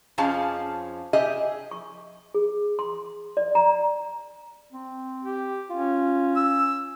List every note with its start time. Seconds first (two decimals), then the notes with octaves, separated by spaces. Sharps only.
0.18 F2 F3 C#4 G#4 F5 A5
1.13 G4 G#4 D#5 E5
1.71 C#6
2.34 G#4
2.79 C6
3.37 D5
3.55 A#5
4.72 C4
5.23 G4
5.70 C#4 F4
6.36 E6